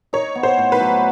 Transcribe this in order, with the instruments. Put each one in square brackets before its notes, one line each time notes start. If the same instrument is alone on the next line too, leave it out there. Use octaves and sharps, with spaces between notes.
[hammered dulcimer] D#4 [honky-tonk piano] C#5
[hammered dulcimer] B3
[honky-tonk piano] C5
[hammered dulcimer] A2
[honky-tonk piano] B4
[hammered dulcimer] F#3